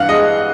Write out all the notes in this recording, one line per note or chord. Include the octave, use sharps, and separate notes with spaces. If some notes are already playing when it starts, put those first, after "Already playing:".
Already playing: G2 E3 F5 F#5
G#3 D#5